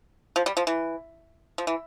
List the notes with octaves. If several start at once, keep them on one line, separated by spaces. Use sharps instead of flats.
F3
G3
F3
E3
F3
E3